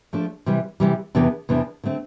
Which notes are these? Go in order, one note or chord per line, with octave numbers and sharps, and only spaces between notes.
F3 A3 D4 A4
C3 E3 G3
C3 E3 G3
E2 C3 E3 B3 D4
E2 C3 E3 B3 D4
D3 A3 C4